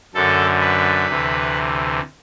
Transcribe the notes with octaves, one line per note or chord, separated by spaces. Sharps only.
F#2 D3 A4
B4
D2 C3 E3